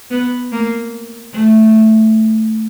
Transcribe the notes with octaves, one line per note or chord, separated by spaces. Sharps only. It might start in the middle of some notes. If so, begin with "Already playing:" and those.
B3
A#3
A3